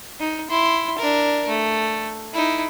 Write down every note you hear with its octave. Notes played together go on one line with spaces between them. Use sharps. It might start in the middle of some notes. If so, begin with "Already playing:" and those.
D#4
E4 C6
D4 A#4
A3
D#4 E4